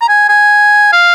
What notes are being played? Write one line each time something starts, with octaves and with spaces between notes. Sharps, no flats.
A#5
G#5
G#5
F5